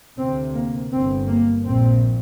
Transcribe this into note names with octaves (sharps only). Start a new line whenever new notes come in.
D2 C3 C4
A#3
G1 G2 C4
A#3
A#1 A#2 C4